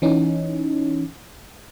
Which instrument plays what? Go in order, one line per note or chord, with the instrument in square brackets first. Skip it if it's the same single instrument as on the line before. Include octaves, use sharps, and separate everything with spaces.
[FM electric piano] E3 C#4 D#4